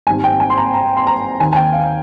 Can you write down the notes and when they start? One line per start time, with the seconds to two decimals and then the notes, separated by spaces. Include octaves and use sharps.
0.07 G#1 G#2 G3 C4 G#5
0.24 G5
0.40 G#5
0.50 C6
0.57 A#5
0.74 A#5
0.97 C6
1.07 A#5
1.40 D#2 D#3 A#3 G#5
1.53 G#5
1.56 G5
1.73 F5